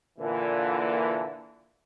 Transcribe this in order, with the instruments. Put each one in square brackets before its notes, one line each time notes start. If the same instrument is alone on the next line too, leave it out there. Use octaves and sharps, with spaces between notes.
[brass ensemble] A#2 D3 E3